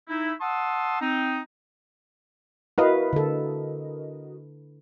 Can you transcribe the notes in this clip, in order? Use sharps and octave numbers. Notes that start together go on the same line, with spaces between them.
D#4 E4
F#5 A5 C6 D#6 E6
C4 D#4
E4 F#4 A#4 B4 D#5 F5
D3 A4